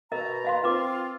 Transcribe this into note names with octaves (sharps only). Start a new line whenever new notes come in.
B2 A#4 D#5 A#5
D#5 F5 C6
C4 F4 B4 D6